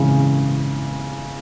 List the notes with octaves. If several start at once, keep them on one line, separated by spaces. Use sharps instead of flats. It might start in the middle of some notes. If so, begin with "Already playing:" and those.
Already playing: C#3 E3 G#3